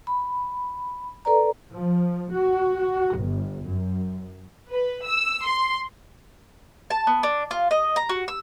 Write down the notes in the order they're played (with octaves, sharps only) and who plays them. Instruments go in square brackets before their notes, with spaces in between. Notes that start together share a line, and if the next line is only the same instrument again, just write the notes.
[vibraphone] B5
A4 B4 D5 A#5
[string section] F3
F#4
G1
F#2
B4
E6
C6
[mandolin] A5
B3
D4
F4
D#5
A#5
F#4
E6